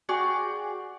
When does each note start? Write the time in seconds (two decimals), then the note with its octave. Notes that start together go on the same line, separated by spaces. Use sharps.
0.09 F#4 G#4 D5 G5